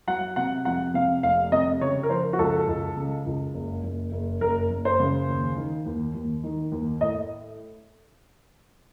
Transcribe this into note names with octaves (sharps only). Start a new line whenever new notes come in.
F#3 F#5
C3 F#5
F2 F#5
C3 F5
F1 F5
C3 D#5
C#3 C#5
A#4
F3 C5
F#4
C#2 A4
C#2
C#3
C#2
F#1
F#1
F#1
F#1 A#4
F#1
C5
C#3
D#2
D#3
D#2
D#2
D#3
D#2
A2 D#5